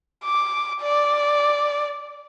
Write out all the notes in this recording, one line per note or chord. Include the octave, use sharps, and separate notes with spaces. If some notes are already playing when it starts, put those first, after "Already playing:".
D6
D5